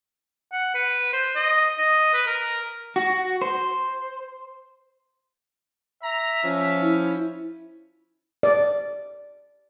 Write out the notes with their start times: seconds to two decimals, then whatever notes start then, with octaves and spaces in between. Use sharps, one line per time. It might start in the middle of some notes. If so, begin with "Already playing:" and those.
0.52 F#5
0.75 B4
1.13 C5
1.35 D#5
1.78 D#5
2.14 B4
2.27 A#4
2.96 F#4
3.42 C5
6.03 E5 A#5
6.43 F3 C#4
6.82 E4
8.43 D5